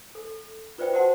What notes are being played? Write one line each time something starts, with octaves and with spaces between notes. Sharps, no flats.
A4
F4 B4 C5 D5 E5 G5
F#4 C5 F#5 A5 C6